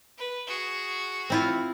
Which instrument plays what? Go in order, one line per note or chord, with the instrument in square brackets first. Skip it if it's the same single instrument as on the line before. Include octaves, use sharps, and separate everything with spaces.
[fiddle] B4
F#4 G#4
[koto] C4 E4 F4